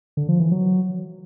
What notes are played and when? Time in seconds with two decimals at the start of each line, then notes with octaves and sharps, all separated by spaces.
0.17 D3
0.29 F3
0.40 E3
0.52 F#3